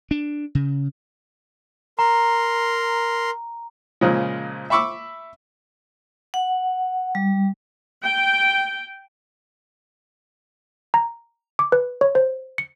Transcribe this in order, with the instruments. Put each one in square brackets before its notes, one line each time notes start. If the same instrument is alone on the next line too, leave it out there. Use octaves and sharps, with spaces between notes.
[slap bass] D4
C#3
[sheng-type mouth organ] A#4 C6 [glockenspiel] A#5
[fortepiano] A#2 C#3 F3 G#3
E5 B5 C#6 D6 E6
[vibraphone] F#5
G3
[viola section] G5
[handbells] A#5
D6
B4
C#5
C5
C#7